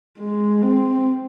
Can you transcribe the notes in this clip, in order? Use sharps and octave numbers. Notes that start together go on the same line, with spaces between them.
G#3
C4